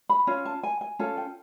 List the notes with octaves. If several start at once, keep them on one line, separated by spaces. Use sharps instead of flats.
B5
C#4 F4
A5
G#5
G#5
C#4 F4 A4
G5